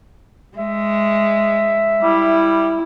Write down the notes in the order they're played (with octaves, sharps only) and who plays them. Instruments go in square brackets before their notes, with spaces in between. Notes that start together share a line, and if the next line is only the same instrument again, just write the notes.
[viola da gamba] G#3 [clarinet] E5
[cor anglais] G3 [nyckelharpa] E4